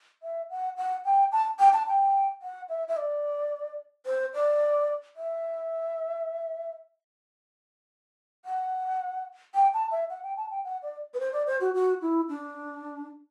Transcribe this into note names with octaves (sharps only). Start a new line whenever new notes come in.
E5
F#5
F#5
G5
A5
G5
A5
G5
F#5
E5
E5
D5
C5
D5
E5
F#5
G5
A5
E5
F#5
G5
A5
G5
F#5
D5
B4
C5
D5
C5
F#4
F#4
E4
D4